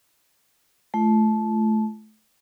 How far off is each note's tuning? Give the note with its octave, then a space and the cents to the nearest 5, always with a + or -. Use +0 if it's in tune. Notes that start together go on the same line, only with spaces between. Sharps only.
A3 -20 F4 -35